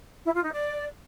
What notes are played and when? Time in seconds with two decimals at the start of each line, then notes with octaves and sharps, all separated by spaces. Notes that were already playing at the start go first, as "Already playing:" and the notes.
0.24 E4
0.34 F4
0.43 D#4
0.52 D5